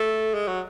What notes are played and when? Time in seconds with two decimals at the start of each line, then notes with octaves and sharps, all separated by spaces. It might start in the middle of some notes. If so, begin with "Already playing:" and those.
Already playing: A3
0.34 G#3
0.48 F#3